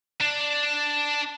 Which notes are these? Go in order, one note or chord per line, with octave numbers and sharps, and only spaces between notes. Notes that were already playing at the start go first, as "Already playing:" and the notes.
D4